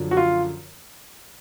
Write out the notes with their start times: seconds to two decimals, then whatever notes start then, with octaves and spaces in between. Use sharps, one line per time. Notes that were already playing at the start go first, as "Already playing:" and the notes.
Already playing: F#2 D3 F3
0.11 F#4
0.17 F4